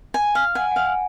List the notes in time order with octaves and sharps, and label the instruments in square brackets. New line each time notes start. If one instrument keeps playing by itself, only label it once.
[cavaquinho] G#5
F5
[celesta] F#5 [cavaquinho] G#5
[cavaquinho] F5 [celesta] F#5
[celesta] G#5